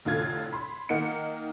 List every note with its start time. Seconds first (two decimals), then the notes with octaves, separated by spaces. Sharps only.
0.05 F1 A2 D3 F4 G#6
0.53 B5 C6
0.89 D#3 A#3 D#4 F#5 C#7